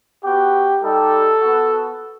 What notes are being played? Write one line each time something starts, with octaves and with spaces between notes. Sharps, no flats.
B3 F#4 G4
G3 D#4 G4 A4
B3 F#4